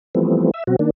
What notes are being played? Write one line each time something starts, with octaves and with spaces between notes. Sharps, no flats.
E3 F3 G3 A3 B3 C4
E5 E6
B2 F#3 C4 F#4
D#3 A#3 D4